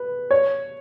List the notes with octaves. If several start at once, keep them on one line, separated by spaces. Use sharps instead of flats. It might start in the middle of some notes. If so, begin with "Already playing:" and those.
Already playing: B4
C#5